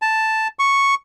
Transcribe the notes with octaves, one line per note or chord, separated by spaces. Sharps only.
A5
C#6